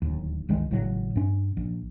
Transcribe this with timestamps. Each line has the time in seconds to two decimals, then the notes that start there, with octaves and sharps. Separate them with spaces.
0.02 D1 D#2
0.49 G1 C#2 D#3 G#3
0.71 G#1 A2 C#3 F#3
1.16 G2 C#4
1.57 A#1